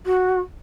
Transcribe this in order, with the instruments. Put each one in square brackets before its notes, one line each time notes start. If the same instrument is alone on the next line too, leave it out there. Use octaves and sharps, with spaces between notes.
[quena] F#4